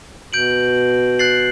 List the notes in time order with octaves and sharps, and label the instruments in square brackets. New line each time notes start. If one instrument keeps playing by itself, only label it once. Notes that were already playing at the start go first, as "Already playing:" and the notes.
[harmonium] B2 [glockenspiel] G6 D7 F#7
[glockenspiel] F#6 A6 C7 F#7